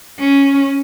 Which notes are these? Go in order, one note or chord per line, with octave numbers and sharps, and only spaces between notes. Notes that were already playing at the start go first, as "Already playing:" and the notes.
C#4